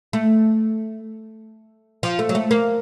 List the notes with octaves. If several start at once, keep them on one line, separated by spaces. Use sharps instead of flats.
A3
F3
A3
F#3
A3
A#3